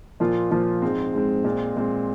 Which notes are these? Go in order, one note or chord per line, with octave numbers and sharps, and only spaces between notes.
A#2 F3 A#3 F4
A#2 F3 A#3 F4
G#2 G#3 C4
G#2 G#3 C4
A#2 G#3 C4
A#2 G#3 C4